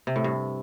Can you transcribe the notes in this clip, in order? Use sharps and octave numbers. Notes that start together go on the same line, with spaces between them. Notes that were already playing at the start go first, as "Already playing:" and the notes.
C3
A2
G2